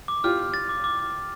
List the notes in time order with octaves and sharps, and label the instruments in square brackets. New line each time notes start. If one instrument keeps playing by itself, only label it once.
[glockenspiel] D6
[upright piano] F4 G4 [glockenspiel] F6
[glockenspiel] F6
A6
D6
D6
D6
D6